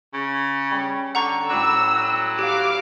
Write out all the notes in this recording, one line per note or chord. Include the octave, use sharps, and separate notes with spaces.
C#3
G3 C#4
D3 F#5 A#5 C#6
A2 F#3 G3 D6 E6
F#3
G4 D5 F5 G#5 D6